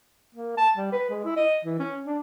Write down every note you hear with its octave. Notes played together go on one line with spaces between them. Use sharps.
A#3
A5
G3
B4
G#3
E4
D#5
E3
C#4
D4